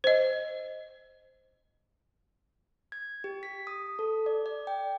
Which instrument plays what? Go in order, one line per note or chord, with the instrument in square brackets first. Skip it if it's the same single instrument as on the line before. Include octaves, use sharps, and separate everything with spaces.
[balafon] C5 D#5
[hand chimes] G#6
G4
B6
D#6
A4
D5
D5
G5